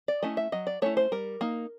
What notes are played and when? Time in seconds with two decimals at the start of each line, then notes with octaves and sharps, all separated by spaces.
0.08 D5
0.23 A3 C#4 E4 D#5
0.37 E5
0.52 F#3 D#5
0.67 D5
0.82 A3 C#4 E4 C#5
0.97 C5
1.12 G3 A#4
1.41 A#3 D#4